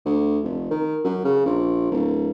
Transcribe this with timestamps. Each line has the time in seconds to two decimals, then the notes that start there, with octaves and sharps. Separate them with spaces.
0.05 D2
0.43 F1
0.70 D#3
1.04 F#2
1.25 C#3
1.46 A#1
1.91 D1